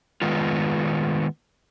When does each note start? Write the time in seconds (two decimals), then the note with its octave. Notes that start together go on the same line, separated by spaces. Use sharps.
0.22 D#3 G#3 B3 F4